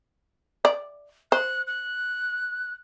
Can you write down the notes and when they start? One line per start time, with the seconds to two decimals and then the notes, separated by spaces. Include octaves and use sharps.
0.65 D5
1.32 C5 F#6
1.67 F#6